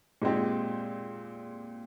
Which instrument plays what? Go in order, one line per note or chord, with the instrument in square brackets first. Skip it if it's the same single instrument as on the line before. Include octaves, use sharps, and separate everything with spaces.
[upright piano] A#2 G#3 C4 G4